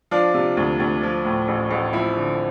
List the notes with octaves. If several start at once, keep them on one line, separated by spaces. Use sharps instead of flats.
F3 D4 F4
C3
D2
D2
F3
A2
A1
A1
F3 C4 E4
D3